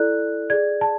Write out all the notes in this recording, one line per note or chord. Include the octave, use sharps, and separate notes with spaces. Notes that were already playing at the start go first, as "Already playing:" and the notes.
Already playing: E4 A4 D5 F#6
G#4 D5 G#6
A5